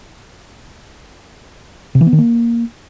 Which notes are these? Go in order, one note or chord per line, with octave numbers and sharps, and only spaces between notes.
C3
E3
B3
D#3
A#3